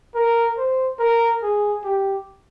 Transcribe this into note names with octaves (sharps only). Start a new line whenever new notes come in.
A#4
C5
A#4
G#4
G4